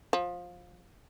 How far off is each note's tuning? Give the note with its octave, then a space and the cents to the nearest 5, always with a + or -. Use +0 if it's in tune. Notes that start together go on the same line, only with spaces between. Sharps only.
F3 +20